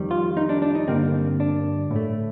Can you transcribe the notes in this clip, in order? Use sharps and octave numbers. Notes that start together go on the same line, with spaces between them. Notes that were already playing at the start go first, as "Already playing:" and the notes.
Already playing: F2 D#3 G3
F4
D#4
D4
D4
D#4
G2 D3 G3 A#3 C4
D4
A2
A3